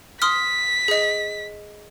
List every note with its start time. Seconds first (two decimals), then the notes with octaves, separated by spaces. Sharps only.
0.22 C6 D#6 F6 B6
0.88 G#4 D#5